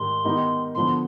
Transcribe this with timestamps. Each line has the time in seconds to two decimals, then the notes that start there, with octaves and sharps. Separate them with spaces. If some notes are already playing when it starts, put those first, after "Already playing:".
Already playing: G#2 D#3 G3 C6
0.24 D#3 G3 B3 D#4 G4
0.74 D3 F3 B3 C6